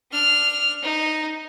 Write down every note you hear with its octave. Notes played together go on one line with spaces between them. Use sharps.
D4 F6
D#4